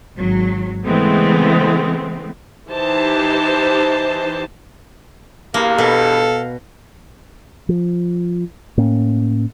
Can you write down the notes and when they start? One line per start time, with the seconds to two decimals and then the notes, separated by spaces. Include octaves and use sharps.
0.18 G#1 F#3
0.85 C#3 E3 G#3 A3 B3 C4
2.69 E3 D#4 G4 C5 A5
5.54 E2 G2 A#3 F5
5.78 B2 A4
7.69 F3
8.77 A2 A#3 C#4